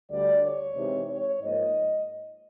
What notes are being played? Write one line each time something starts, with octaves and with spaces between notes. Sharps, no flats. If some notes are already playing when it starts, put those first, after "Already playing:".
D2 D3 G3 D5
C#5
C3 E3 G#3 C4 D#4
C#5
G#2 F3 A#3 D#5